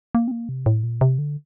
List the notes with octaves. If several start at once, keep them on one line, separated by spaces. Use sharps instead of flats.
A#3
C4
A#3
C3
A2
A#2
C3
D3